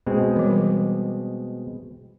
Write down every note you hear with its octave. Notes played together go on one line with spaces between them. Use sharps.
B2 G#3 C4
E3 G3